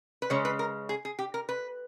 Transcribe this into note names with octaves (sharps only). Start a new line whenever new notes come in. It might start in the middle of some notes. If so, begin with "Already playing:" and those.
B4
C#3 G#3 C#4 C#5
B4
A#4
G#4
G#4
G4
A#4
B4